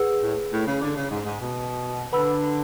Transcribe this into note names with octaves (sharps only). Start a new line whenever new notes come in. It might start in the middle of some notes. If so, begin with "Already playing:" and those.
Already playing: G#4 B4 F#5 E6
A2
A2
C#3
D3
C#3
G#2
G#2
B2
D3 B4 F#5 B5 E6